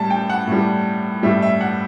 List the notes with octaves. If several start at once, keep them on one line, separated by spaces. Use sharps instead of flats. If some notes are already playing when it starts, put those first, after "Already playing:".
Already playing: A2 G3 A5
G5
F#5
A2 G3
A2 G3 E5
E5
F#5